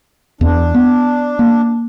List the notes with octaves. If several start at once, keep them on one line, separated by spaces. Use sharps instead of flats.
E2 D4
B3
A#3